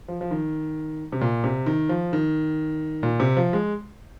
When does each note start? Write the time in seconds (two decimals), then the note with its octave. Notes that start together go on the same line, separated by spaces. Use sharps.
0.08 F3
0.21 F3
0.31 D#3
1.12 C3
1.21 A#2
1.44 C3
1.66 D#3
1.89 F3
2.13 D#3
3.03 A#2
3.20 C3
3.37 F3
3.53 G#3